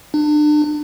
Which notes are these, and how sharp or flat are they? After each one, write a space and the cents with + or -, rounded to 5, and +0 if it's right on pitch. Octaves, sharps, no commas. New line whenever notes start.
D4 +35